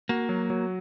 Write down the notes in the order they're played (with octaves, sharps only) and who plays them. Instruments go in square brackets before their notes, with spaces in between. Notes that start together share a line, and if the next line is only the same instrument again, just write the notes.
[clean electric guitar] A#3 [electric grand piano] F#4
[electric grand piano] F#3
F#3